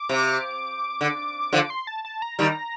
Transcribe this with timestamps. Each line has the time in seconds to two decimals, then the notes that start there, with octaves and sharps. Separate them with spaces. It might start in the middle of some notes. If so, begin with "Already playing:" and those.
Already playing: D6
0.09 C3
1.01 D3
1.53 D3 F3
1.70 C6
1.87 A5
2.05 A5
2.22 A#5
2.39 D#3 G3